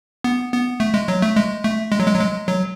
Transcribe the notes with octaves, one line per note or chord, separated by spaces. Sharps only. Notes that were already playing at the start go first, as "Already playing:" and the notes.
B3
B3
A3
G#3
F#3
A3
G#3
A3
G#3
F#3
G#3
F#3
G#3
F#3